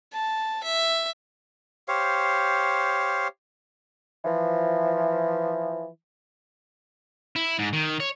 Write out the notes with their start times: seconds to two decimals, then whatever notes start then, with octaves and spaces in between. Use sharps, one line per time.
0.13 A5
0.63 E5
1.88 G4 C5 C#5 F5
4.25 E3 F3
7.36 E4
7.59 G#2
7.73 D#3
8.00 C#5